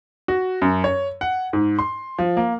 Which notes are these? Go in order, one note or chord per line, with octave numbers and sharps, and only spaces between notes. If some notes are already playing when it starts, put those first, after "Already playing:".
F#4
F#2
C#5
F#5
G#2
C6
F3
A#3